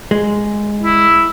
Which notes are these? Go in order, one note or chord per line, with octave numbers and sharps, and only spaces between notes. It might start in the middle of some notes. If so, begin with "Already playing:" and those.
G#3
E4